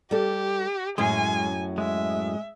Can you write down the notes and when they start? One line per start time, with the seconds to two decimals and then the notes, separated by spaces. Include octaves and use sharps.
0.11 G3 G4 A4
0.98 F#2 A2 F#3 G#3 C#4 G#4 G#5
1.78 G#3 E5